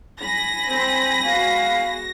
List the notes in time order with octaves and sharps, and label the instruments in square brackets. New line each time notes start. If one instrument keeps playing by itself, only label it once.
[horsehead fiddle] G#5 B5 [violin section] A#6
[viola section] C4
[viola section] G#3 B3 F#4 [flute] F5